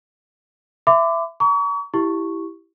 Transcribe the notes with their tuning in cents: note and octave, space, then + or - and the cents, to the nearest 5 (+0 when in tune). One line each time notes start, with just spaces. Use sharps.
E5 +15 B5 +45 D6 +0
A#5 +0 C#6 +40
E4 +5 G4 -5 C#6 +0